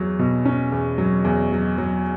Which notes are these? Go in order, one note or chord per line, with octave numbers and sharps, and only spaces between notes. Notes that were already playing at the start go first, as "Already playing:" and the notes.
Already playing: E2 F#3
B2
C#4
E2
F#3
E2
F#3
F#3